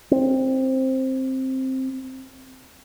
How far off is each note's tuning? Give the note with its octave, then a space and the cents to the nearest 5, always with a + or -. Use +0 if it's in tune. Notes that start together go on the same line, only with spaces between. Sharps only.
C4 +10